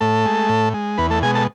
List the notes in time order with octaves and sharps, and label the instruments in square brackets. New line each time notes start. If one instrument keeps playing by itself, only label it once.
[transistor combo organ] A2 A3 A4
G#3
A2
G#3
E2 B3 B4
A3 A4
B2 G#3 G#4 G#5
A4 A5